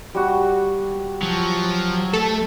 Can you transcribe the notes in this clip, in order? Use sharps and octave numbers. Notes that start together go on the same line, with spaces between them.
G3 F#4
F3 F#3
A3 A4